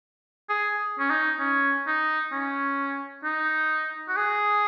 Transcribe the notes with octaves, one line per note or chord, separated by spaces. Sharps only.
G#4
C#4
D#4
C#4
D#4
C#4
D#4
F#4
G#4